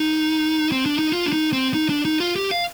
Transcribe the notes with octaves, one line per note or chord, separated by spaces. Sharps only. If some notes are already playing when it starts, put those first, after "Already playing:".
Already playing: D#4
C4
D4
D#4
F4
D4
D#4
C4
D#4
D4
D#4
F4
G4
F5